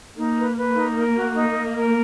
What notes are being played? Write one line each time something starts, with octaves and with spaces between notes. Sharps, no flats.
A#3 D#4
B4
B4
D#4
A#4
F#4
D#4
D#5
A#4